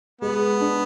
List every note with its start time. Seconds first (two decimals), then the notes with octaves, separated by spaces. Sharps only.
0.21 G#3 B3
0.60 D4